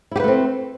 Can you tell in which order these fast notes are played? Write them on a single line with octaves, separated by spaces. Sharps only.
E4 G4 B4 A3 C4